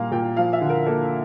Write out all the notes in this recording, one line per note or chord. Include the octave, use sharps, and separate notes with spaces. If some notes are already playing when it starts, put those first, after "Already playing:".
Already playing: A#2 G3 A#3 F5
A#2 G5
F3 F5
E5
D3
A#4
A#3 A4